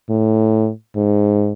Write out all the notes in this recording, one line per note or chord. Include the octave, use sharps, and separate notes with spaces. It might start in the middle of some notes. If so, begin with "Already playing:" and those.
A2
G#2